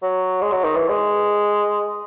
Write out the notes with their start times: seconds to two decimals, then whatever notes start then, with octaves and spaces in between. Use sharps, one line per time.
0.03 F#3
0.42 G#3
0.52 F#3
0.64 D#3
0.77 E3
0.89 G#3